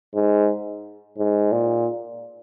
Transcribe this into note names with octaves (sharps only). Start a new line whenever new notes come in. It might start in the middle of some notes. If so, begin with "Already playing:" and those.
G#2
G#2
A#2